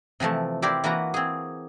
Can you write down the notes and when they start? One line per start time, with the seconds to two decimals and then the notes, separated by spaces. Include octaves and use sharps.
0.20 C3 E3 F3 A3
0.62 E4 G4 A#4 C5 D5
0.84 E3 A#3 F#4 B4 A#5
1.14 C4 G#4